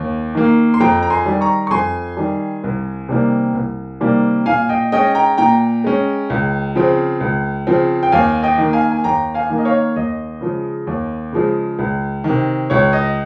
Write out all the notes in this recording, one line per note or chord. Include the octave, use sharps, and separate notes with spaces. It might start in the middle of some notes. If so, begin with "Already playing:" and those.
Already playing: D#2
D#3 A#3
C6
F2 G5 A#5
A#5
G#5 C6
D#3 G3
A#5 C#6
C#6
F2 G#5 C6
D#3 G3
C2
C3 D#3 G3 A#3
C2
C3 D#3 G3 A#3
A#2 F5 G#5
D#5 G5
G#3 C#4 D#5 G5
G5 A#5
A#2 G5 A#5
G#3 C#4
C#2
C#3 F3 C4
C#2
C#3 F3 C4
G5
D#2 F5 G#5
D#5 G5
D#3 A#3
F5 G#5
G#5
D#2 G5 A#5
F5 G#5
D#3 A#3
D#5
C#5 F5
D#2 D#5
C#3 F3 G#3
D#2
C#3 F3 G#3
C#2
C3 D#3
C#2 C#5
D#5